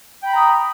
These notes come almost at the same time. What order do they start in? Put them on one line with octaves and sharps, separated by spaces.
G5 B5 A#5 D#6